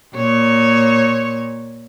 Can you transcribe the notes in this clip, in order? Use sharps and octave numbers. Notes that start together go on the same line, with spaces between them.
A#2 C#5